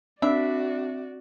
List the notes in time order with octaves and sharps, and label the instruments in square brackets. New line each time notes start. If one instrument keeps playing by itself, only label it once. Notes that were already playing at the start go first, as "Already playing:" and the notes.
[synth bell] C4 [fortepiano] D4 [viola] F#4 D5 [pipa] E5